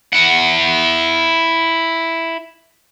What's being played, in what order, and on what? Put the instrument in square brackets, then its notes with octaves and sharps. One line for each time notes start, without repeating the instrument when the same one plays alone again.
[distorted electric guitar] E4 F#5